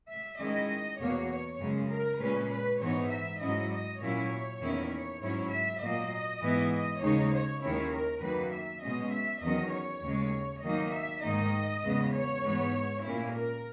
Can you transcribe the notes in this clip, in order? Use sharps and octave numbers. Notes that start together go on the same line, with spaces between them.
E5
D#3 G#3 C#4 E4 D#5
E2 B2 A#3 C#5
C#5
F#2 C#3 G#3
A#4
A#2 G#3 C#4 B4
B4
G#2 E3 B3 D#4 C#5
E5
G#2 F#3 C#4 E4 D#5
D#5
A#2 F#3 C#4 E4 C#5
E2 D#3 A#3 C#4 E4
C#5
G#2 F#3 C#4 E4 C#5
E5
A#2 F#3 A#3 D#5
G#2 E3 B3 E4
D#5
D#2 C#3 G#3 D#4 C#5
C#5
D#2 D#3 G#3 C#4 E4 C#5
A#4
F#2 D#3 A#3 B4
E5
B2 G#3 C#4 D#5
E5
E2 D#3 F#3 C#4 D#5
C#5
D#2 C#3 G#3
D#3 F#3 A#3 D#4 D#5
E5
G#2 D#3 A#3 D#4 D#5
E2 C#3 G#3 B3
C#5
G#2 E3 B3
A#2 A#3 C#4 E4
A#4